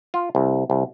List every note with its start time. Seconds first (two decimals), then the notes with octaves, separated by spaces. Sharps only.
0.14 F4
0.35 C2
0.70 C2